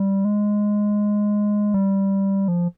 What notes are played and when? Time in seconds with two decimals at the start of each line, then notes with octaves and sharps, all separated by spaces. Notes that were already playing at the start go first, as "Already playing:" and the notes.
Already playing: G3
0.25 G#3
1.74 G3
2.48 F3